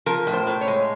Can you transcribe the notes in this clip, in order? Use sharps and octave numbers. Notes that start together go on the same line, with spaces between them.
F3 A#4
A2
C5
A2
C#5
G#3